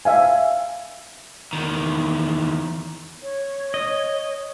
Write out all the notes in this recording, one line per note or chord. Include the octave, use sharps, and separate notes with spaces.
E5 F5 G#5
E2 D#3
C#5
D#5